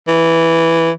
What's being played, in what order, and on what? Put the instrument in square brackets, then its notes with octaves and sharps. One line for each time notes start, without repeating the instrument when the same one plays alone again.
[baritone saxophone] E3